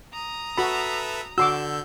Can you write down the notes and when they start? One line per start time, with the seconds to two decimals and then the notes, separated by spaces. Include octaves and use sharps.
0.13 A#5 D#6
0.58 F#4 A4 B4 E5 B5
1.38 D3 F#4 C6 D6 E6 G6